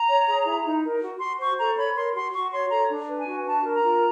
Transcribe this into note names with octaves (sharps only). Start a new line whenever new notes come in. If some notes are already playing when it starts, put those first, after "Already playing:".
Already playing: A#5
C#5
G#4
E4
D#4
A#4
F#4
F#4 C6
C5 C#6
A4 A#5
C#5 B5
A#4 C6
F#4 C6
F#4 C#6
C#5 C6
A4 A#5
D4
B4
G#5
F#4
D4 A5
A#4
A#5
F4